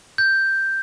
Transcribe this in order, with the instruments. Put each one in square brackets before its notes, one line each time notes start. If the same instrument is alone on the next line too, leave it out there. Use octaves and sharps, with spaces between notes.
[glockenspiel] G6